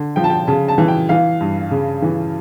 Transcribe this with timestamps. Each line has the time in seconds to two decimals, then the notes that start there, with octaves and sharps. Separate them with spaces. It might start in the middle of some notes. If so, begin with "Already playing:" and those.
Already playing: D3
0.16 F3 G5
0.24 A5
0.30 G5
0.47 C#3 A5
0.68 A5
0.78 E3
0.88 G5
1.09 E3 F5
1.40 G2
1.71 C#3
2.02 E3